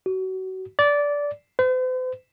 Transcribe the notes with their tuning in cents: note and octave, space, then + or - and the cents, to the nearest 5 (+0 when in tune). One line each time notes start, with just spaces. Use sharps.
F#4 +30
D5 -15
C5 -45